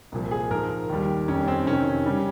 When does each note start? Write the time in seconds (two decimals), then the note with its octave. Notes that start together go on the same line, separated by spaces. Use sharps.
0.12 C2 A#2 F3
0.31 G#4
0.51 G#2 F3 A#4
0.89 D#2 D#3 G3
1.28 F2 D#3 G3 C#4
1.48 C4
1.67 F2 C3 D#3 C#4
2.06 C#3 G3